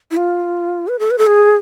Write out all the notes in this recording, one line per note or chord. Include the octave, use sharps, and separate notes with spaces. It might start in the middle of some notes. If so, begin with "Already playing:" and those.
E4
F4
B4
A4
B4
A4
G#4